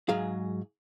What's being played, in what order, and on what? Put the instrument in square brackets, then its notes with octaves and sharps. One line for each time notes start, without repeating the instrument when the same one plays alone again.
[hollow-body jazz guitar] G#2 F#3 G#4 F5